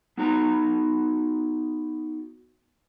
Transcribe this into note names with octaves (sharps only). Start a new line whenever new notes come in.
B3 D#4 F#4 A#5